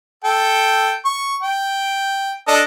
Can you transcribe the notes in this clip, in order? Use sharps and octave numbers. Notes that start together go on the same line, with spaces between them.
A4 G5
C#6
G5
D4 A4 D#5